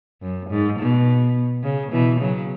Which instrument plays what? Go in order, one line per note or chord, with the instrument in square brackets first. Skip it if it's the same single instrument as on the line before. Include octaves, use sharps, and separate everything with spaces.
[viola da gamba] F#2
G#2
B2
C#3
B2 E3
C#3 F#3